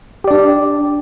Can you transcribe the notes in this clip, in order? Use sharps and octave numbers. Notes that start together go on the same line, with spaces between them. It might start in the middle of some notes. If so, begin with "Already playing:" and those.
D4 G4 D5